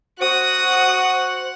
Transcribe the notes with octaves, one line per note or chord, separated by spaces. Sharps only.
F#4 C5 F#5 D#6